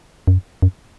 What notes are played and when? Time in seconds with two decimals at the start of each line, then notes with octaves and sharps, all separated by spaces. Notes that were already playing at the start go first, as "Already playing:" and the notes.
0.27 F#2
0.62 F#2